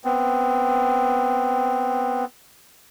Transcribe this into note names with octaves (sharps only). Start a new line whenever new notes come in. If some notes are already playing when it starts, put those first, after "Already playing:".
B3 C4